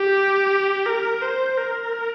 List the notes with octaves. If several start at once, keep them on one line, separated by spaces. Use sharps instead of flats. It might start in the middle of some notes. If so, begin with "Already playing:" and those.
Already playing: G4
A#4
C5
A#4